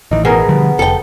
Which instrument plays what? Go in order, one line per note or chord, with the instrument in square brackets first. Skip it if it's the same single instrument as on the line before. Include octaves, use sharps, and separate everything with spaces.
[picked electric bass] A1 E3 [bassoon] D#4
[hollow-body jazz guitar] B2 [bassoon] B3 [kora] G#4 A#4
[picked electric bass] D3 F3 G3
[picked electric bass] F1 [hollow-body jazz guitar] A4 G5